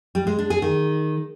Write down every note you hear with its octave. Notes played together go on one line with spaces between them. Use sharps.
G3
G#3
D4
G#4
D#3